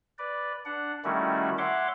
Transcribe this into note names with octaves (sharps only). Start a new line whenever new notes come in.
B4 D5
D4 F#5
D#3 G3 A3 C#4 E4 F#4
C#5 E5 F#5 C6 D6